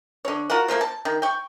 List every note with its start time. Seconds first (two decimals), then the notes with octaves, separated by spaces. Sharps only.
0.25 D3 C#5
0.50 F4 F#4 A#4 F#5
0.68 A3 A#3 F4 C5
0.81 A5
1.05 D#3
1.22 G5 C#6